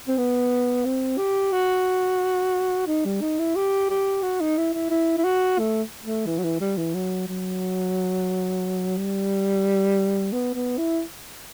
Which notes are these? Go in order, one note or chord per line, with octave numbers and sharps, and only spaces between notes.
C4
B3
C4
G4
F#4
D#4
G3
D#4
E4
G4
G4
F#4
D#4
E4
E4
E4
E4
F#4
A3
A3
E3
F#3
E3
G3
E3
F#3
F#3
G3
B3
B3
E4